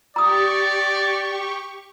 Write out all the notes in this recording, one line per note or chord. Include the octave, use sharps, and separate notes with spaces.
G4 D5 A#5 C#6 D#6